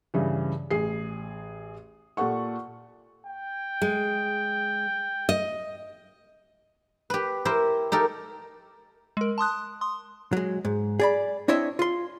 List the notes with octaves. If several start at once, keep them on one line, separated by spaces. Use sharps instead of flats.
G2 C#3 E3
A1 G#4 C7
A#2 G4 A4 F#5 C#6
G5
G#3
D#5
G4 B4
E4 G4 A#4 C5
D#4 G4 A4 A#4
G#3 A#4
A5 C6 D#6 F#6
C6 D#6
F#3 G#3
G#2
G#4 D5 B5
C4 D4 E4 C#5 D#5 E5
F4 C6